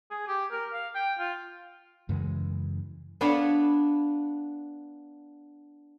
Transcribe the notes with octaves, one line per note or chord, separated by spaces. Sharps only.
G#4
G4
A#4
F5
G5
F4
F#2 C#3 E3 G#3
B3 D4 C#5 F5 A5 B5